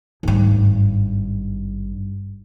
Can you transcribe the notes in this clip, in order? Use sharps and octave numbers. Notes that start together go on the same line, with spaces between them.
G#1 G2